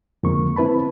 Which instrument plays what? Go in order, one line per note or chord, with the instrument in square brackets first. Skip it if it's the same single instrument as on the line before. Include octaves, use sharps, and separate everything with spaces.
[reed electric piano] F2 D3 G#3 A#3 C#6
C4 E4 B4 A5 B5